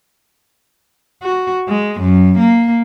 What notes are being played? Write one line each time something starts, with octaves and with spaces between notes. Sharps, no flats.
F#4
G#3
F#2
A#3